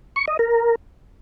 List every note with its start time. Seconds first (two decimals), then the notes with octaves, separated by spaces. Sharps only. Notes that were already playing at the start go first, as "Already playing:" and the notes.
0.16 C#6
0.28 D#5
0.39 A#4